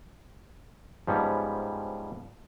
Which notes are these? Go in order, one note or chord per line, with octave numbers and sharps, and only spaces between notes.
G#2 F3 G3 B3 C#4